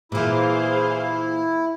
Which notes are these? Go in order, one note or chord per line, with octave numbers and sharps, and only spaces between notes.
A#2 E3 E4 G#4 C5 F5